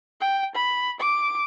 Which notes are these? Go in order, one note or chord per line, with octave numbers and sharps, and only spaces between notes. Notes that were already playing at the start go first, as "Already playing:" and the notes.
G5
B5
D6